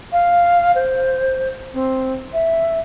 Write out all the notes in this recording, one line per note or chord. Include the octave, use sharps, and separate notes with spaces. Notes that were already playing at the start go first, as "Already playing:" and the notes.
F5
C5
C4
E5